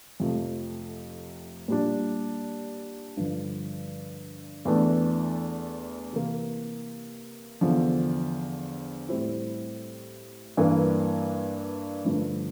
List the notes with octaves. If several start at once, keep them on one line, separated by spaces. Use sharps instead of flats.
F2 C3 F3 A3
A#2 G3 D4
G2 D3 F3
E2 E3 A3 D4
C3 E3 A#3
E2 D3 F3
A2 G3 C4 E4
G2 E3 A#3 D4
G2 D3 F3 A3